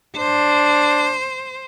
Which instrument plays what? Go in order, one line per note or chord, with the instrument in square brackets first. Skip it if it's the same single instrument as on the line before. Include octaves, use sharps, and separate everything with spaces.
[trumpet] D4 [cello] C5